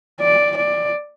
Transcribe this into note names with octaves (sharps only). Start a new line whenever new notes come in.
D5
D5